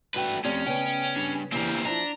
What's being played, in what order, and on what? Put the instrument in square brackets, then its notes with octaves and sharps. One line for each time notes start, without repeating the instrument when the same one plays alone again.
[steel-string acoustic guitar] G2 F#4 G5 [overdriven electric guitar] A3 B4
[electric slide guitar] F3 C4 [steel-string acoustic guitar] A3 G4 D5 [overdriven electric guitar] C#4
[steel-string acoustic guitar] C#3 B3 [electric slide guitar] G5
[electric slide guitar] G3 D4
[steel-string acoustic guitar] E2 C#3 E3 [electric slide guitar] A#3 E4 G4 [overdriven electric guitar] C4 A#4
[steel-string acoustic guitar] F3 E4 [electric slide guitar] D4 [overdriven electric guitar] A#5